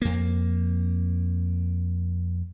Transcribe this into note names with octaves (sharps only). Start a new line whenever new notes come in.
F2 A#3